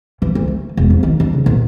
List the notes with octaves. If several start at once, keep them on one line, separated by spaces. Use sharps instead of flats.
E3
D2
A3
E1
F2
D#3
D4
C#3
D#1